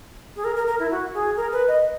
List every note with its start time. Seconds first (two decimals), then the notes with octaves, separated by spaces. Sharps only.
0.36 G#4
0.44 A#4
0.56 A#4
0.67 A#4
0.79 E4
0.91 F#4
1.14 G#4
1.37 A#4
1.52 B4
1.68 D#5